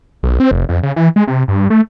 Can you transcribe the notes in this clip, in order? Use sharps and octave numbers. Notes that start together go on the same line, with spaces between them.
B1
C4
F1
F2
C#3
E3
G#3
C3
G2
A3